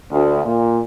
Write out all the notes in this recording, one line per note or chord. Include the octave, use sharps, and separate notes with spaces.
D2
A#2